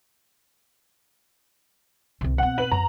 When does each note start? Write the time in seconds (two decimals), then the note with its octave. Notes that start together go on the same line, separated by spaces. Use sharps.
2.21 C2 C3
2.38 B2 C4 F#5
2.58 B4 F#7
2.72 F#2 A#5